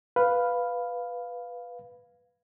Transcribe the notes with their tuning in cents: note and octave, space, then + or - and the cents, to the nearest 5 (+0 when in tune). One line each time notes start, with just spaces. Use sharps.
B4 +0 F5 +0